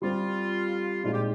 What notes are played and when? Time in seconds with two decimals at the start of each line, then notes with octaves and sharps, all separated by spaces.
0.02 G3 C4 F4 G4
1.04 A#2 G#3 C4 D#4 F4 G#4
1.13 G4